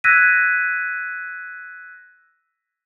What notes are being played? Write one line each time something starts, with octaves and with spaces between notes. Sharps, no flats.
E6 F#6 G#6 A#6 B6 D#7